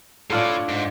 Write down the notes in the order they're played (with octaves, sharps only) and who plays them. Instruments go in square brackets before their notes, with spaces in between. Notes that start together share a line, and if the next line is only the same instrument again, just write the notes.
[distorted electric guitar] A2 [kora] D4 F4 A4
[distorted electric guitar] G#2